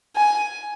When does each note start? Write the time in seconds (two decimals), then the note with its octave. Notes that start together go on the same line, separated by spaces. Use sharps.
0.16 G#5